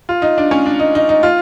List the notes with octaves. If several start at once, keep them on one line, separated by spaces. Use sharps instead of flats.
F4
D#4
D4
C#4
D4
D#4
D#4
D#4
F4